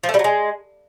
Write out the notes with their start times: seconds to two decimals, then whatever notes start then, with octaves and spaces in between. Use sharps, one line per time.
0.04 F3
0.09 A3
0.14 G3
0.19 F#3
0.24 G#3